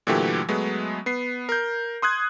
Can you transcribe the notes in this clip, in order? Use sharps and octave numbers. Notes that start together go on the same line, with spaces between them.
A#2 D3 E3 F#3 A3 G4
F#3 G#3 A3 B3
B3 C7
A#4 G6
C6 D#6 F#6 G#6